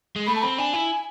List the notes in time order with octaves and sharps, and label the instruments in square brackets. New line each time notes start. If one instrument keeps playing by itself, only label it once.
[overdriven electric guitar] G#3
[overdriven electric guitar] A3 [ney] B5
[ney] A5
[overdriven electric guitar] C4 [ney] B5
[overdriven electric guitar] D4 [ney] G#5
[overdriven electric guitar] E4